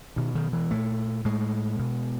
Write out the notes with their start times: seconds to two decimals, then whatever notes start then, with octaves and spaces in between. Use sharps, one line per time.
0.16 B2 D#3
0.35 D#3
0.53 E3
0.71 A#2 A3
1.25 A2 G#3
1.79 B2